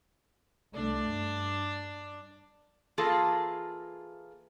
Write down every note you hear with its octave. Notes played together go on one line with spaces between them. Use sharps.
C2 A3 D4 D5
G2
E3 A#3 F4 G#4 A4 A5